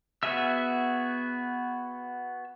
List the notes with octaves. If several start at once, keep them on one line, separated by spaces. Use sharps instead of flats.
B3 F#4 G#4 E5 E6